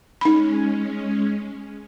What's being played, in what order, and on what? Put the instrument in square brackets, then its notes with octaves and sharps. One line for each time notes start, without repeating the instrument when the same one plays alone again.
[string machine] G#3 C#4 [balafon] D#4 B5